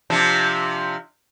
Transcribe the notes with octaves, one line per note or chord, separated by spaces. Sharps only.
C3 F3 D4